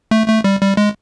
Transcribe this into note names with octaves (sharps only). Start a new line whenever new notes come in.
A3
A3
G3
G3
G#3